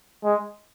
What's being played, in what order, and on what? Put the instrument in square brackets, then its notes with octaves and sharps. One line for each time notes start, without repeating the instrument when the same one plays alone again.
[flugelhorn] G#3